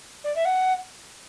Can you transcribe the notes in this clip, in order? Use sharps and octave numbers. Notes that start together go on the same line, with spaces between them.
D5
E5
F#5